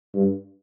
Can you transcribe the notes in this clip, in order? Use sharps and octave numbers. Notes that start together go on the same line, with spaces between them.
G2